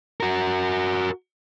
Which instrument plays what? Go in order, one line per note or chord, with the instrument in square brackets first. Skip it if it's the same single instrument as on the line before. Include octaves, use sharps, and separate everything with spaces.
[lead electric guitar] F#4 A#4